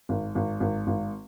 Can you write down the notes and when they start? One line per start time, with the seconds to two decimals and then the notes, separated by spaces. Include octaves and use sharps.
0.09 G#1
0.35 G#1
0.60 G#1
0.87 G#1